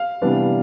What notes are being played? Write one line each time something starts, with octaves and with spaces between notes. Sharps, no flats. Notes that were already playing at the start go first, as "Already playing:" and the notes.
Already playing: F5
C3 E3 G3 B3 D4